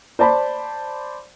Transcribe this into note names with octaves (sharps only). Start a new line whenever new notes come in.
C5 D5 A5 B5